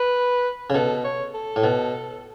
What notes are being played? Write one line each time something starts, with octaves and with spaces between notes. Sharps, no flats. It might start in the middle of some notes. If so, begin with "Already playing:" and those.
Already playing: B4
C#3
B2 A4
C#5
A4
A2
B2